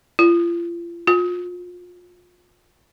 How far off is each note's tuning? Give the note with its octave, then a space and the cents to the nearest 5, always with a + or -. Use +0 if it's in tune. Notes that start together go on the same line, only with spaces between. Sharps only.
F4 -35
F4 +30